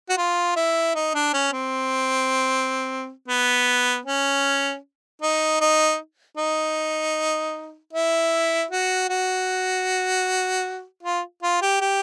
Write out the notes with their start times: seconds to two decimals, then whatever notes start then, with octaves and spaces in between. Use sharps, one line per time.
0.09 F#4
0.18 F4
0.56 E4
0.95 D#4
1.15 D4
1.33 C#4
1.53 C4
3.28 B3
4.05 C#4
5.22 D#4
5.61 D#4
6.38 D#4
7.93 E4
8.71 F#4
9.09 F#4
11.03 F4
11.43 F4
11.62 G4
11.81 G4